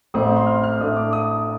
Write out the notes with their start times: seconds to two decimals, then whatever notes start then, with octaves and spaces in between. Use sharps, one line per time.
0.14 A1 A2 A3 C4 D#6
0.25 C6
0.36 C6
0.47 F6
0.63 F6
0.80 A2 A3 D4 D#6
0.97 D6
1.13 D#6